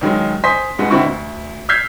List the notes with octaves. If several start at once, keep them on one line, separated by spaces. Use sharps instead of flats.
C#2 D#3 F#3 G#3
C5 G#5 C6 D#6 B6
G1 G2 G#3 F#5
D3 D#3 C4 E4 F#4 C#6
D2
E6 F6 G6 G#6 B6 C7